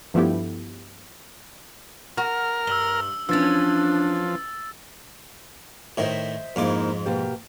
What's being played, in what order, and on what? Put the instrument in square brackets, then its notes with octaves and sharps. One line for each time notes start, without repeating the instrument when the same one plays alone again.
[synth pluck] G2 F3 A3 B3 E4 G4
[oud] F#4 [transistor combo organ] A#4 F6
[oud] G2 [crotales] E6 F#7 G7
[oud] E3 C#4 [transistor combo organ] F3 [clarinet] D4 [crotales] E6 A6
[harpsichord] A2 D#3 [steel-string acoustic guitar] C5 D#5 E5
[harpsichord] F2 G#2 D6 [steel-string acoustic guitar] A#3 D#4 E4
[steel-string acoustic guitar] B2 A#3 G4